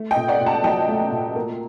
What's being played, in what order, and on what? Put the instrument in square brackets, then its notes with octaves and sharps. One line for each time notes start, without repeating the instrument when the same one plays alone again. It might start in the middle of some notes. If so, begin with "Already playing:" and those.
Already playing: [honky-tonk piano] A3
D#5 G5
A#2
D5 F#5
A#2
F#5 A5
F#3 D#5 G5
A3
A#2
A#3